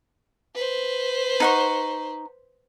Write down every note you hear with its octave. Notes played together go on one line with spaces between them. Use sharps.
B4 C5
D#4 F#5 C#6